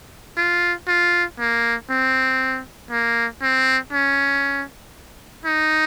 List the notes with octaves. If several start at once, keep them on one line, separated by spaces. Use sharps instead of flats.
F4
F4
A#3
C4
A#3
C4
C#4
D#4